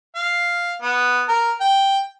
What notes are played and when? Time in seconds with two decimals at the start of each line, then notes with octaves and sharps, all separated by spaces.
0.15 F5
0.82 B3
1.28 A#4
1.61 G5